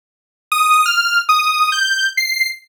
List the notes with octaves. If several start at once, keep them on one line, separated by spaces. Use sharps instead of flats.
D#6
F6
D#6
G6
C7